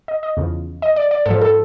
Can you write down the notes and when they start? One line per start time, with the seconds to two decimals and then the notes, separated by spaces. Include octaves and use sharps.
0.08 D#5
0.23 D#5
0.37 E2 C#3 F3
0.82 D#5
0.96 D5
1.11 D5
1.26 G#2 F3 A4
1.42 A4